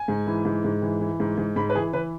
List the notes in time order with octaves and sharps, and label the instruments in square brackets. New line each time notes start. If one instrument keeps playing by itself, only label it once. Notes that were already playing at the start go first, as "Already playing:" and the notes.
Already playing: [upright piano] G#5
G#2
E3
G#2
G#2
E3
E3
G#2
G#2
G#2 B5
B4
E3 G#4
E3 B4